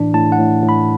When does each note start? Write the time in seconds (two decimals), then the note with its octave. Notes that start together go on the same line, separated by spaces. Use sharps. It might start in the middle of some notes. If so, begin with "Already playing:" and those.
Already playing: A2 E3 D4
0.14 A2 A5
0.32 F#5
0.39 A2
0.63 A2
0.69 B5